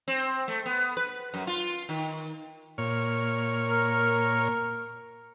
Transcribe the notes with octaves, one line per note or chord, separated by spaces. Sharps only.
C4
A3
B3
B4
F#2
F4
D#3
A#2 C#5 F6
A#4